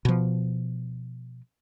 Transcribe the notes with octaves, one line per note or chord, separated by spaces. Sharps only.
B2 F3